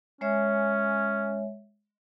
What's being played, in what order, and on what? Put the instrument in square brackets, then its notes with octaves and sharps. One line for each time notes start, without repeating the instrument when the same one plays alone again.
[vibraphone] G#3 C#5 E5 [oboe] C#4